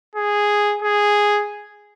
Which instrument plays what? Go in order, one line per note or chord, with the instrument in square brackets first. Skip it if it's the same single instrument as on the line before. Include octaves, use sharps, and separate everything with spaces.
[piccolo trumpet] G#4
G#4